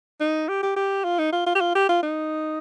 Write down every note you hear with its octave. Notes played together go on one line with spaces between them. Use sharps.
D#4
G4
G4
G4
F4
D#4
F4
F4
G4
F4
G4
F4
D#4